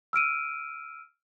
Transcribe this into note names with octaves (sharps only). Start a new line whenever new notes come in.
E6 F6 D7 D#7